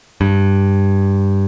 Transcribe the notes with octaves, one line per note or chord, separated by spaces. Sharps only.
G2